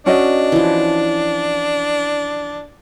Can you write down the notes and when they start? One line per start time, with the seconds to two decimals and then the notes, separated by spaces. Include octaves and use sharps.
0.06 C#4 D4 F#4 D#5
0.52 E3 F3